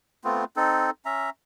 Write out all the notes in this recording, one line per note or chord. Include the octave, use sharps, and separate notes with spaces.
A3 B3 C4 F4
C4 D#4 A4
C#4 E5 A#5